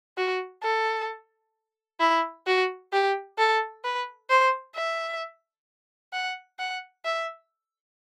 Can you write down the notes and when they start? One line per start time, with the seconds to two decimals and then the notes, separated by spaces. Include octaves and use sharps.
0.17 F#4
0.63 A4
2.00 E4
2.47 F#4
2.93 G4
3.38 A4
3.84 B4
4.30 C5
4.75 E5
6.13 F#5
6.59 F#5
7.05 E5